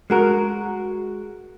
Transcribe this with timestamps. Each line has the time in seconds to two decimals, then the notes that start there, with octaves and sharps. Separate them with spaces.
0.10 G#3 F#4 A#4